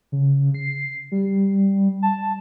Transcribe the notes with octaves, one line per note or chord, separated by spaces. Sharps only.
C#3
C7
G3
A5